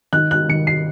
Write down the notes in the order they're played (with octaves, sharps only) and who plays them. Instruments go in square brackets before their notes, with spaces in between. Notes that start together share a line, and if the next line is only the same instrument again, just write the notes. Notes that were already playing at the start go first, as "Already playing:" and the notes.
[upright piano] D#3 F#6
F#6
D#3 C#7
C7